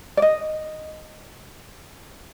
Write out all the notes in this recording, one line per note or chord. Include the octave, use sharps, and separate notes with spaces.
D5
D#5